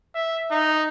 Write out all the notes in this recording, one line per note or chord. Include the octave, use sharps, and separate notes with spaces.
E5
D#4